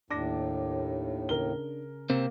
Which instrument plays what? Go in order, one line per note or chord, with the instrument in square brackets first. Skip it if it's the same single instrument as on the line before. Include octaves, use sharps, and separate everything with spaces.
[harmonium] D#2 A2 [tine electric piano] D4 [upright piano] D6 A#6
[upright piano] C#3 A#4 G7
[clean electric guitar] C3 C4 [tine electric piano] A#3